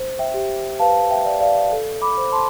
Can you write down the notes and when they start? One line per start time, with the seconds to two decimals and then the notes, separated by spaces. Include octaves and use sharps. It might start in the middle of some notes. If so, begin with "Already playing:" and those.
Already playing: C5
0.19 E5 G5
0.34 G4
0.80 B4 F5 A5
1.10 E5 G5
1.25 D5
1.41 D5 F5
1.72 A4
2.02 B5 D6
2.17 C5
2.32 A5 C6